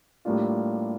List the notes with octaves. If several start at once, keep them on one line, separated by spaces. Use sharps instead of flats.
A2 G3 A#3 D4 F4